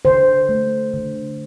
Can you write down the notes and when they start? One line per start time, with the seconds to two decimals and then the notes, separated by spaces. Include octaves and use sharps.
0.05 D3 C5
0.49 A3
0.93 D3